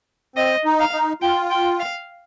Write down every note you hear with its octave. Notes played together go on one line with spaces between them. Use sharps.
C4 D#5
D#4
F5
D#4
F4 G5
G5
F5